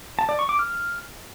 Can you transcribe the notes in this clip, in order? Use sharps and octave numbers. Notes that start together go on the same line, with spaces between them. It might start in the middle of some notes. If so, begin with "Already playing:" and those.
A5
D5
C#6
D6
F6